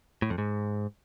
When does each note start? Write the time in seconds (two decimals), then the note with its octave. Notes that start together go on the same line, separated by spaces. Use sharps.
0.22 A2
0.30 F2
0.38 G#2